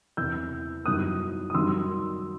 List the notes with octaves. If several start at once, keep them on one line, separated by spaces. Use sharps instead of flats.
E2 C3 E3 E6 G6
F#2 E3 G3 B3 D#4 D#6 F#6
D#6
F#2 D#3 G3 D#4 C6 E6